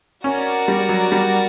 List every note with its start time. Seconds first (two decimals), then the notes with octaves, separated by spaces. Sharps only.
0.24 C#4 F#4 A#4 D5
0.68 G3
0.89 F#3
1.12 G3